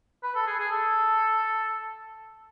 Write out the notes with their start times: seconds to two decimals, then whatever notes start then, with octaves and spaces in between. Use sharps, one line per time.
0.23 B4
0.35 A4
0.47 G#4
0.59 G#4
0.71 A4